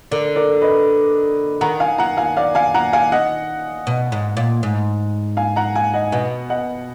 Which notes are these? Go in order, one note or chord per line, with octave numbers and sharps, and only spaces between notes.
D3 A#4 D5
A#4 D5
B4 D#5
D#3 F#5 A#5
F5 G#5
F#5 A#5
F5 G#5
D5 F5
F5 G#5
F#5 A#5
F5 G#5
D#5 F#5
B2
G#2
A#2
G#2
F5 G#5
F#5 A#5
F5 G#5
D#5 F#5
B2 D#5 F#5
D#5 F#5